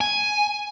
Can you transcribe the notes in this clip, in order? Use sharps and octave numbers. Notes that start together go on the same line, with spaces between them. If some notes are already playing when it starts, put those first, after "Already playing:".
G#5